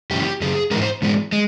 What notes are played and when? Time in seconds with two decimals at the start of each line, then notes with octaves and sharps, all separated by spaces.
0.11 F#2 C#3 E3 G4
0.41 F#2 C#3 G#4
0.71 G#2 E3 G#3 A#4
0.81 C5
1.02 G#2 E3 G#3
1.32 G#3